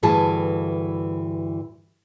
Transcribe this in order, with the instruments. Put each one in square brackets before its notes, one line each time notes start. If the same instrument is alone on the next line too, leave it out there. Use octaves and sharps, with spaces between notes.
[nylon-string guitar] D2 G2 E3 G#4 A5